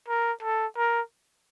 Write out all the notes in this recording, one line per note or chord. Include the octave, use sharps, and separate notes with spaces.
A#4
A4
A#4